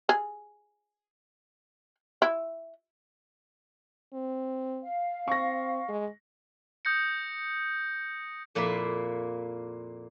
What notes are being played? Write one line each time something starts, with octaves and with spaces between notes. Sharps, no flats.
G#4
E4
C4
F5
C4 C#6 A#6
G#3
D#6 G6 A#6 C#7
F2 A#2 A#3 E4 E5